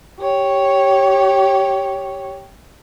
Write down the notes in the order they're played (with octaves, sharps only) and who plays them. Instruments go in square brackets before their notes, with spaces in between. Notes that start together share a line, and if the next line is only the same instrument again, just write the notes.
[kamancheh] G4 C#5